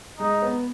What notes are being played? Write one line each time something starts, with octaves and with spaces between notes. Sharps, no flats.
G#3 D#4
B3